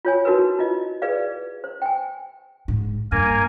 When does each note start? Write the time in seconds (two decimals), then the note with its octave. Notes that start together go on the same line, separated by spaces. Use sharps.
0.05 F4 C#5 G#5
0.25 D#4 E4 F#4 A#4 B4
0.59 E4 F4 D#5
1.02 G#4 B4 D5 F5
1.64 C5
1.82 G5 G#5
2.68 G#2
3.12 G2 A#3 A#4 G#5